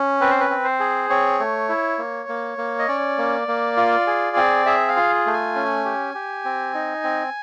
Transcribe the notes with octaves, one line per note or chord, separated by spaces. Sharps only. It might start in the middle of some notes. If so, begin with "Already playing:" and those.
Already playing: C#4
C4 B4
C5
B4
C4
C5
G#4
C4 C#5
A3
E4
A#3
A#3
A#3
D#5
C#4 D5
A#3
A#3
F4
G#4
C4
G#4 E5
F5
F4
A3
G#5
C#4
G4
G4
C4
D#4
C4